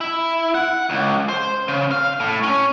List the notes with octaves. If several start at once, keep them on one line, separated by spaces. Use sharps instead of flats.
E4
F#5
C#2
C5
C#3
F5
A2
C#4